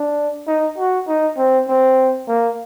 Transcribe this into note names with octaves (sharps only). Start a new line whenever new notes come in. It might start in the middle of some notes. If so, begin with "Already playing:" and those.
Already playing: D4
D#4
F#4
D#4
C4
C4
A#3